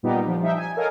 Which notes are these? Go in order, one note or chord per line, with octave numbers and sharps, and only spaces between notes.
A#2 G3 B3 D#4 G4
F3
F3 G3 D#4 E5 G5
G#5
A4 A#4 C#5 D#5 F5 G#5